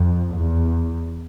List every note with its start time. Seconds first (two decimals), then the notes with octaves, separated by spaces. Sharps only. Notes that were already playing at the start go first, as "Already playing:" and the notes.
Already playing: F2
0.35 E2